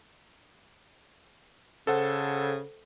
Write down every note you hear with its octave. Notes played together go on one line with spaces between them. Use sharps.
C#3 A4 C5 F#5